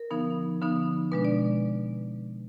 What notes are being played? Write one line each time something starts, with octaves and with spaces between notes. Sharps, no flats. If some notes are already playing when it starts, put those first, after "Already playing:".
Already playing: A#4
D3 F3 B3 D#4
D3 F3 B3 D#4
B2 G#3 D4 B4
D5